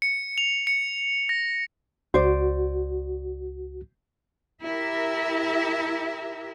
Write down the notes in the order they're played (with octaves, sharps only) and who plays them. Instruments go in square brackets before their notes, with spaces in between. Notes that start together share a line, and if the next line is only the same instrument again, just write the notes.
[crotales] C#7
F7
C#7
A#6
[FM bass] C#2 [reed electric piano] F#4 [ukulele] C5 D5
[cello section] E4 G4 A#4 E5